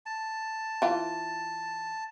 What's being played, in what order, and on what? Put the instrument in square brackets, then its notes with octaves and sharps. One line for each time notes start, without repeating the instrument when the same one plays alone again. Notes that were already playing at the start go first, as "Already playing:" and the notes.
[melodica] A5
[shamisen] E3 F4